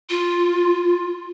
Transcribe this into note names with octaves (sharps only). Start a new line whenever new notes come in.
F4